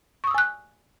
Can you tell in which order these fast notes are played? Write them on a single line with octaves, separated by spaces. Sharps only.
C#6 D#6 E6 G#5 F#6